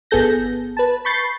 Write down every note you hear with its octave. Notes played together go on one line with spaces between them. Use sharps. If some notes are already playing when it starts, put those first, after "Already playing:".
G1 B3 G#4 A4 G6 A#6
B4 A5
B5 C#6 G6 A6 C7